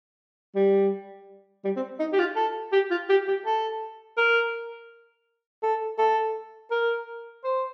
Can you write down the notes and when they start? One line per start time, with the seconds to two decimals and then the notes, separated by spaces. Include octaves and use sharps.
0.55 G3
1.64 G3
1.76 C4
2.00 D#4
2.13 G4
2.19 F4
2.36 A4
2.72 G4
2.90 F4
3.09 G4
3.28 G4
3.46 A4
4.17 A#4
5.63 A4
5.98 A4
6.71 A#4
7.44 C5